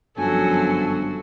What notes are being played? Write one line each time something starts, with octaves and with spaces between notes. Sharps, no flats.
G1 F#2 F3 F#4 A4 G#5